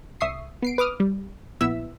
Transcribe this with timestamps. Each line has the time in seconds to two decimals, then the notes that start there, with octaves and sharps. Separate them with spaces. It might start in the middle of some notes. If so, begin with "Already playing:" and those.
0.21 C2 E5 C#6 D#6 C7
0.62 B3 C7 D7
0.78 B4 D6 D#6 F6
1.00 G3
1.61 A#1 B3 E4 E5 E6 B6